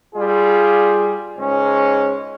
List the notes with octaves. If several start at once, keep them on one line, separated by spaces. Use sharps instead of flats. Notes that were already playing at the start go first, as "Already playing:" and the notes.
G3 F4 G#4
C#2 G#2 G#3 C#4